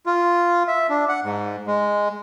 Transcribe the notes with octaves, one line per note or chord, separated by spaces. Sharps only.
F4
E5
D4
F#5
G#2
G#3